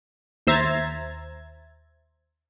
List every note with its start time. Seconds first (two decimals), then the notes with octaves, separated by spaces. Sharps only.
0.47 D#2 C5 E5 A#5 G#6 A6